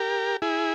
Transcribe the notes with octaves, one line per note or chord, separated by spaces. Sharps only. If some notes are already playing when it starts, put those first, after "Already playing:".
Already playing: G4 A#4
E4 G#4